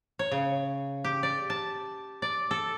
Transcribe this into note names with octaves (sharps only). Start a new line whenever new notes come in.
C#5
C#3
G4
D5
A5
D5
A4